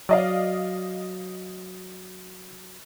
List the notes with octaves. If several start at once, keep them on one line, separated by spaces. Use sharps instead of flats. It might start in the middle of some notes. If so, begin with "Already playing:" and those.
F#3 D5 D#5 F5